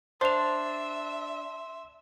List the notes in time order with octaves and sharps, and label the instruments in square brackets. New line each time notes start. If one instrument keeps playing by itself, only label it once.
[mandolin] D4 [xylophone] C5 F7 [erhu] E5 [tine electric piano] C6